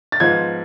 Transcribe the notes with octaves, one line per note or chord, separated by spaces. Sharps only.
A6
G#2 F3 B3 F4 G#6